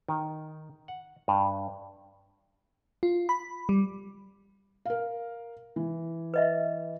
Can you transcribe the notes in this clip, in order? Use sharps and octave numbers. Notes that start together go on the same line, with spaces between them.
D#3
F#5
G2
F4
B5
G3
A#4 F5
E3
B4 D#5 E5